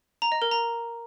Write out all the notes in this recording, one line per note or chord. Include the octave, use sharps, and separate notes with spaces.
A#5
D#5
A#4
A#5